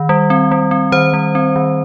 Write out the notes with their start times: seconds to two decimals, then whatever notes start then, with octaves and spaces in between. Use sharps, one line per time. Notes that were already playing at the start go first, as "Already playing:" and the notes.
Already playing: D#3
0.09 G3
0.30 C4
0.51 G3
0.71 C4
0.92 D#3 C5
1.14 G3
1.35 C4
1.56 D#3